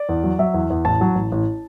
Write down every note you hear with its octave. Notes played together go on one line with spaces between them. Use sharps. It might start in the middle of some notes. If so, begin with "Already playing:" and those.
Already playing: D5
E2
F#3
F#3 E5
E2
E2
A1 A5
F#3
A1
A1